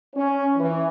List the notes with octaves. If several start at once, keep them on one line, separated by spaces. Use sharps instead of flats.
C#4
E3